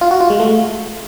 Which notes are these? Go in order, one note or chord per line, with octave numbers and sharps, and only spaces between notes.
F4
F#4
F4
G#3
A3